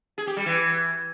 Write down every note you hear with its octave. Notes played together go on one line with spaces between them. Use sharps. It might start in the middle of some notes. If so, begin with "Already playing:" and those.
G#4
G4
G3
E3